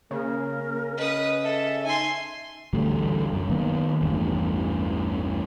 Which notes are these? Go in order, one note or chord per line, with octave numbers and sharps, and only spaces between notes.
C#3 A#3 A#4
C#4
B4 D#5 D#6
A4 E5
D#4 G#5 C6
A1 D2 G3 A3
F#2
D#3 A#3 B3
A1 E2 G2